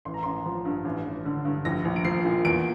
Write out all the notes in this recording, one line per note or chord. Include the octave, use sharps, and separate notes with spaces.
A1 C6
A#5
A1 C6
F3
G2
A1
A1
D3
G2
A#1 A#6
A#1
D7
F3 C7
A#2
E2 D7